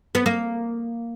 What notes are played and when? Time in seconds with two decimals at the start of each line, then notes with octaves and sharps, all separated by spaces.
0.15 B3
0.26 A#3